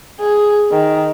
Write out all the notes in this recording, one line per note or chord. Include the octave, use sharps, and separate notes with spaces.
G#4
D#3